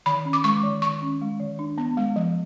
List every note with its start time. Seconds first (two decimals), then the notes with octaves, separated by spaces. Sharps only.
0.06 D#3 B5
0.25 C#4
0.33 D6
0.44 G#3 C#6
0.63 D#3
0.82 D#3 C#6
1.02 C#4
1.21 G#3
1.40 D#3
1.59 D4
1.78 B3
1.97 G#3
2.16 F3